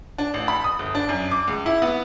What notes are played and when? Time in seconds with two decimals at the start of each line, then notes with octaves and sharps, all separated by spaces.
0.18 D4
0.34 A1
0.48 B5
0.64 D#6
0.79 G1
0.95 D4
1.09 F#2
1.31 D6
1.48 C#2
1.66 E4
1.82 B3